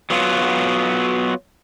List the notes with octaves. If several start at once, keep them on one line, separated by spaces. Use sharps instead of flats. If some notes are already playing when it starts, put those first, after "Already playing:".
F#3 B3 F4